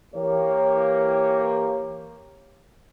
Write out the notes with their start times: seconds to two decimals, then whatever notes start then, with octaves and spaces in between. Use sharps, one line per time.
0.15 E3 A#3 G4 C#5